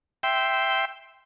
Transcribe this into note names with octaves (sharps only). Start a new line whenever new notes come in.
E5 G5 C6